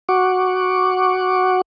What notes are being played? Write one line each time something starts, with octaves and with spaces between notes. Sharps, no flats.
F#4 F#5 C#6 D6